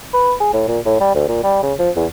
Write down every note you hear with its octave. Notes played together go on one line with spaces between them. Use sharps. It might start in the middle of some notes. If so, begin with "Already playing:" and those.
B4
G#4
A2
A#2
A2
G3
D2
A#2
G3
C#3
F3
E2